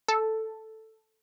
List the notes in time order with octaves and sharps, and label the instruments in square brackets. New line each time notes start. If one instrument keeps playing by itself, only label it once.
[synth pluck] A4